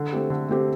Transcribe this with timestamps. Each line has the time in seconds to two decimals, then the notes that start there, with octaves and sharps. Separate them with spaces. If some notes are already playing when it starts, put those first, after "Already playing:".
Already playing: D3
0.12 A3 C4 G4
0.30 D3
0.48 A3 C4 G4